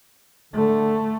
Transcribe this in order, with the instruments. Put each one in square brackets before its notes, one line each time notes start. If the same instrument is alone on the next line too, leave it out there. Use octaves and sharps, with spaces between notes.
[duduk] D3 [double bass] A3